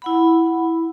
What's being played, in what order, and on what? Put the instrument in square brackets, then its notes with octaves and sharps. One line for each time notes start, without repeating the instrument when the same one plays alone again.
[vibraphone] E4 F#5 B5